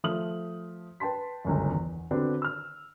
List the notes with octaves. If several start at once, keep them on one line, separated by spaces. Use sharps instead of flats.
F3 A3 D#6 F6 F#7
B4 G5 A5 C6 B6
G1 C#2 F#2
E2
D3 B3 C4 D4 F#4
E6 F6